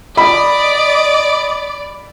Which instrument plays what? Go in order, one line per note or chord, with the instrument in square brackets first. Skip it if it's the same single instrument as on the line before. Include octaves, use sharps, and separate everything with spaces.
[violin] D5 [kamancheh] D#5 [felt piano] B5